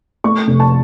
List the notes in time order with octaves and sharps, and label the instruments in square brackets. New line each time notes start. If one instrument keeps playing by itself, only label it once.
[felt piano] A3 C#6
F1
A5